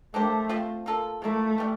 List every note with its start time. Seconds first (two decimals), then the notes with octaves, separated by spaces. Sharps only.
0.14 A3 A#3 D4 G4 C5
0.49 F3 C4 F4 C5
0.86 A#3 F4 A4
1.22 F3 A3 A#3 E4
1.58 E3 G3